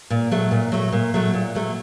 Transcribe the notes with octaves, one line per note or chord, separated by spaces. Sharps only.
A#2
F#3 A3
A#2
F#3 A3
A#2
F#3 A3
A#2
F#3 A3